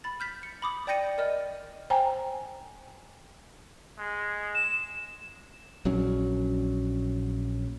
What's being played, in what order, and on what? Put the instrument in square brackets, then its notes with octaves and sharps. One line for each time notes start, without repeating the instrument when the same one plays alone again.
[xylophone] B5 A6
F6 G6 B6
C#7
B5 D6 D#6
D5 G5 G6 A#6 C#7 D#7
A#4 D5 D#5 F6
[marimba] C5 G5 G#5 A#5
[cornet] G#3
[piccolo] E7
[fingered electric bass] A#1 F#3 C#4